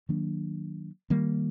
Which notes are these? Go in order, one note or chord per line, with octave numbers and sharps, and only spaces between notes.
D#3 F#3 A#3 D4
D#3 G3 A#3